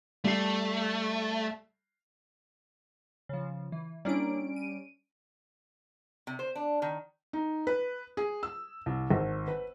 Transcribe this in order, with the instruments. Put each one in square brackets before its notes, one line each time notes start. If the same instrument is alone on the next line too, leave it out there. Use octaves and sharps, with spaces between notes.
[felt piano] G3 C7 [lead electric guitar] A3
[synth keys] C#3 F3
E3
[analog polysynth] G3 C#4 D7 [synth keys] A#3 D4 E4
[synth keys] D#7
[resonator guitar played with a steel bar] C3
C5
D4
D#3
[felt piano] D#4
B4
G#4
E6
C2
G#1
B4